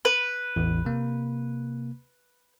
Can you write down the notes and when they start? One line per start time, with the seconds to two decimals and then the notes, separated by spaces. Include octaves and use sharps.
0.05 B4
0.56 A1 E2 E3
0.85 C3 A#3